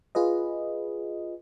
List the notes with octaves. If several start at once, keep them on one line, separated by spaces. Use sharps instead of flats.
F4 G#4 B4 D#5